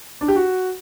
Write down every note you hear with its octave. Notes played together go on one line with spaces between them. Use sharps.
D4
G4
F#4